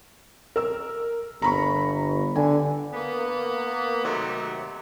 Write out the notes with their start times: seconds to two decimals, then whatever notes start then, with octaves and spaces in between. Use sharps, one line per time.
0.56 A#4 E6
1.42 G1 A#5 B5 C#6
2.36 D3 G#5
2.94 A#3 B3
4.04 C3 D#3 F#3 A3